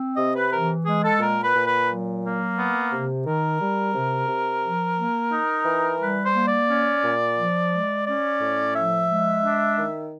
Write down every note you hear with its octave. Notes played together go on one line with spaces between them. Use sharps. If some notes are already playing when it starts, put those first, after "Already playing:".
Already playing: C4
C3 D#5
B4
E3 A#4
G#3 G#4
A4
A#2 A#4
B4
A#2
B4
F#3
A#3
B3
C3
D#3 A#4
G3
C3
C3
F3
A#3
D#4
E3
G3 B4
C5
A#3
D5
C#4
A#2
F3
G#3
C#4 D5
A2
F3 E5
G#3
D4
D#3